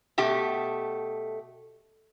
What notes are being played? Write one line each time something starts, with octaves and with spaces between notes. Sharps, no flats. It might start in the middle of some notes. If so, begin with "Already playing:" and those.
B2 A3 G4